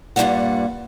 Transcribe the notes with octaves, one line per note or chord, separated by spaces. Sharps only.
G2 A#2 F3 G3 G#3 F#5